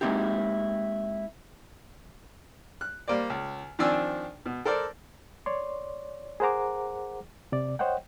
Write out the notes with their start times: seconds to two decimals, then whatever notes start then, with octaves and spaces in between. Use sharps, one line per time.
0.01 G#3 A#3 C4 D#4 E4 G4
2.81 F#6
3.08 G3 A#3 C5 D5
3.30 C#2
3.79 D#3 F3 C4 D4 G#5 E6
4.46 B2
4.65 A4 A#4 C5 D5
5.46 C#5 D5 C6
6.40 G#4 A#4 C5 F#5 A#5 D6
7.52 C3 D5
7.79 C5 C#5 D#5 F#5 G5